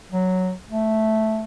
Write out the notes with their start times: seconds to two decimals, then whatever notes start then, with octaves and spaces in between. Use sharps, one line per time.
0.12 F#3
0.69 A3